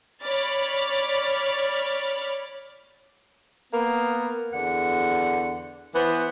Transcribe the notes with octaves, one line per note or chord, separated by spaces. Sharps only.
C#5 D5 B5 F6 A6
A#3 B3
E2 D3 F#5
E3 B3 C5